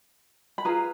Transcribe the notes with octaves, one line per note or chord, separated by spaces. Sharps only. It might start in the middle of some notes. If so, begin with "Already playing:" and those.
B5
F4 G#4 B4 A#5